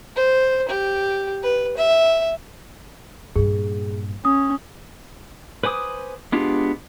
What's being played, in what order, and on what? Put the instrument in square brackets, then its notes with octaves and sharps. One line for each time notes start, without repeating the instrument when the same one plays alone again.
[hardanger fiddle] C5
G4
B4
E5
[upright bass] G2 A#2 [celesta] G#4
[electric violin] C#4 [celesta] D#6
[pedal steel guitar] B4 C5 G#5 D6 D#6
G#3 B3 D4 F4 G4